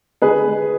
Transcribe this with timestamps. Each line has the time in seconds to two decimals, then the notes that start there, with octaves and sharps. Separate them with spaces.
0.22 D3 G#4 B4
0.47 G#3